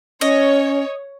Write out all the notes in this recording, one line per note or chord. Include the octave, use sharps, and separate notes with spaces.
C#4 C#5 D#5